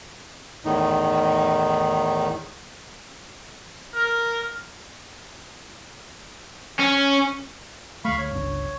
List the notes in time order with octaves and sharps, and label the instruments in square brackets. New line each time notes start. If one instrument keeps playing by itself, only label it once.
[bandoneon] E2 A2 D#3 D#4
[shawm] A#4
[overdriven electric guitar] C#4
[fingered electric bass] D2 A3 [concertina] F5 B5 C#6
[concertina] C#5
[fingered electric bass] G1 C#2 D4